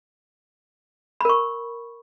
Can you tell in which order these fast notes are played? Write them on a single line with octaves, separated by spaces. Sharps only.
B5 A#4 C#6